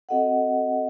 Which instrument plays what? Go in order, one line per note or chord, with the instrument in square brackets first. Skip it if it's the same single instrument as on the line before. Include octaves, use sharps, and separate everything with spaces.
[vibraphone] C4 F#4 A4 D#5 F#5